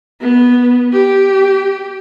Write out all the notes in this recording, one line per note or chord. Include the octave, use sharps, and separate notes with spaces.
B3
G4